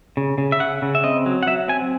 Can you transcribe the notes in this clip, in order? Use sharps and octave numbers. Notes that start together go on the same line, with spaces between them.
C#3
C#3
E5
C#3 F#5
C#3
E5
C4 D#5
F#3
F#5
F#3 E5
C4 G#5